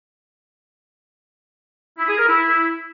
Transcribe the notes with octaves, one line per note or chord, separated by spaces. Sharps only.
E4
G#4
A#4
E4